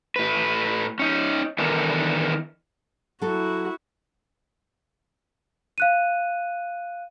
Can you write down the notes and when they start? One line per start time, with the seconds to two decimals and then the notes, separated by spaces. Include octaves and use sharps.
0.16 A2 B4
0.99 C#4 D#4
1.59 D#3 E3 B3 D4 A4 A#4
3.21 F#3 E4 F#4 A4
5.78 F5 F#6 D#7